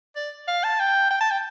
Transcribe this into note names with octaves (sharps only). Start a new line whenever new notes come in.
D5
F5
A5
G5
G5
A5
G5